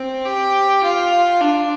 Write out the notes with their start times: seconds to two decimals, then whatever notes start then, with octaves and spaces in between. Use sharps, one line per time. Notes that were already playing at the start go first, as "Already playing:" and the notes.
Already playing: C4
0.25 G4
0.83 F4
1.40 D4